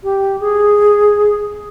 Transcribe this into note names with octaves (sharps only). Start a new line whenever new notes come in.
G4
G#4